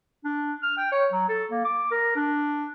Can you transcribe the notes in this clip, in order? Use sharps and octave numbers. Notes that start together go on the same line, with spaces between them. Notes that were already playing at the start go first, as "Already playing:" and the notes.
D4
F6
G5
C#5
F#3
A4
A#3
D6
A#4
D4